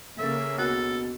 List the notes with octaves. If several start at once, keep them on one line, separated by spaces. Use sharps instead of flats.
C#3 A#3 A4 E5 A6
D2 B2 F#4 A4 F#6